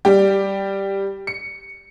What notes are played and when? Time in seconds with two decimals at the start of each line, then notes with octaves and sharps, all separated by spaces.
0.05 G3 G4
1.27 C#7